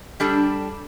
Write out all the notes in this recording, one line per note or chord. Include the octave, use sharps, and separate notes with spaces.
G3 D4 A4